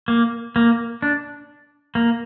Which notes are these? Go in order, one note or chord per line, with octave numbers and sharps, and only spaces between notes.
A#3
A#3
D4
A#3